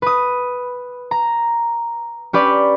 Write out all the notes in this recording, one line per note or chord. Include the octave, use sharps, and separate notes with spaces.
B4 D#6
A#5
C#4 G4 B4 D5